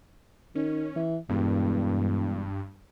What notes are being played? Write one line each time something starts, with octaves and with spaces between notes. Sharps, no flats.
D#3 C#4
E3
E1 G2